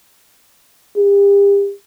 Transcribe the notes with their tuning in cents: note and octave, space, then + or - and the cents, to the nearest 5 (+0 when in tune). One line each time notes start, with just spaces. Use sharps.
G4 +35